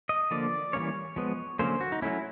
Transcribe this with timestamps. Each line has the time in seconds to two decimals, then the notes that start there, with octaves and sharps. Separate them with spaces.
0.09 D#5
0.31 D3 F3 A#3 D5
0.73 E3 G3 A#3 C#4 C#5
1.16 F3 G#3 B3
1.59 D3 F#3 A#3 C#4 C5
1.81 F#4
1.92 D#4
2.02 F#3 A3 C#4 E4